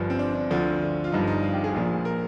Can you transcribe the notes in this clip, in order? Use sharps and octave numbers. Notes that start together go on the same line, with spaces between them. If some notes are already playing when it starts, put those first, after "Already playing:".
Already playing: G1 G2 F3
C4
D4
D4
D2 D3 F3
F4
G1 G2 F3 D#4
D#4
F4
G4
G#4
A#1 A#2 F3
A#4